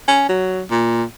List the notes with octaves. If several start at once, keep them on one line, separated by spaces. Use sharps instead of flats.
C#4
F#3
A#2